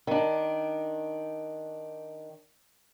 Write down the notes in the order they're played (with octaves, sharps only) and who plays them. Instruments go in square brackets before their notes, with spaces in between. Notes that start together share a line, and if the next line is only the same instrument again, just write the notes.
[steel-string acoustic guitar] D#3 D4